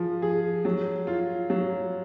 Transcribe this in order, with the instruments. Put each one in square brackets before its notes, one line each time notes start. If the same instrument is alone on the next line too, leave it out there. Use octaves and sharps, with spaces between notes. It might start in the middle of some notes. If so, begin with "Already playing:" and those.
Already playing: [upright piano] F3 G#4
G#4
F#3
F4
F#3